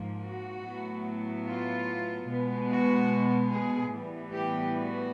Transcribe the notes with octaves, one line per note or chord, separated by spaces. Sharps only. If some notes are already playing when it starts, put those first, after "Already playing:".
Already playing: G#2 F3 A#3
F#4
A2 F#3 B3
F4
B2 G#3 B3
F#4
G#4
A2 E3 G3 B3
G4
F#4